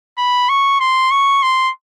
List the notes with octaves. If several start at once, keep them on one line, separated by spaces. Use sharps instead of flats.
B5
C#6
C6
C#6
C6